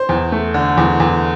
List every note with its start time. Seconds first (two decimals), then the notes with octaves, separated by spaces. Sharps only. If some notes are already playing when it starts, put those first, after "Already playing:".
Already playing: C5
0.09 E2
0.32 A3
0.54 D3
0.77 E2
1.00 E2